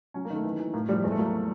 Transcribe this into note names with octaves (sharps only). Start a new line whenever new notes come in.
F#3 C#4
A#3
D#3 A3
E3
E3
A2 A#3
F3 G3
E2 G#3
A3
F#3 A#3